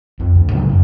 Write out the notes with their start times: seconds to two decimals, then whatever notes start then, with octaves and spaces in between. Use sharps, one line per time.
0.19 F2
0.35 D2
0.50 G#2 C#3 F#3
0.69 F#2